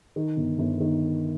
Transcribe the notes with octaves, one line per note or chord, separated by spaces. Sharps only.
D#3
G1
G1
D#3